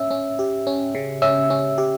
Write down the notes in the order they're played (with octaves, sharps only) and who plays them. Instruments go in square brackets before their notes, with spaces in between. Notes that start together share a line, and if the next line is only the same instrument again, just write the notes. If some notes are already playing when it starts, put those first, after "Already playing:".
Already playing: [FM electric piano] C#4 [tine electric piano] E5 E6
[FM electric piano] C#4
G4
C#4
C#3
[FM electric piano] C#4 [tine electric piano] E5 E6
[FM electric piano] C#4
G4